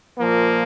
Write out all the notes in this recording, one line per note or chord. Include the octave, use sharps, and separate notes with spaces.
A#2 F3 A#3